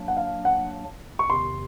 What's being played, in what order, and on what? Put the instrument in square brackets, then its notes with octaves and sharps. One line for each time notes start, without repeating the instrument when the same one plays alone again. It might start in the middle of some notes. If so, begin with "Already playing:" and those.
Already playing: [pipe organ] F#3 A#3 D4
[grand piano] F#5
F5
F#5
C#6
[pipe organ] E2 C3 D#3 [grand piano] C6